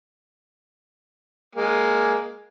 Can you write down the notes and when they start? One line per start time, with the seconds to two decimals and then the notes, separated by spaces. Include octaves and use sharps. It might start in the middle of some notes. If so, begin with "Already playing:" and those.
1.55 G#3 A#3 G#5